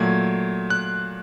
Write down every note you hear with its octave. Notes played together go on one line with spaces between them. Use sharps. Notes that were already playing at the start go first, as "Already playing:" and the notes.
Already playing: A#2 F#3 A3 G#6
F#6